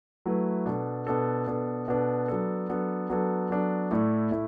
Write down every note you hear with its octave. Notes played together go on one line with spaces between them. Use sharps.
F#3 A3 E4 B4
B2 B3 D4 A4
B2 B3 D4 A4
B2 B3 D4 A4
B2 B3 D4 A4
F#3 B3 D4 A4
F#3 B3 D4 A4
F#3 B3 D4 A4
F#3 B3 D4 A4
A2 A3 E4 A4 D5
A2 A3 E4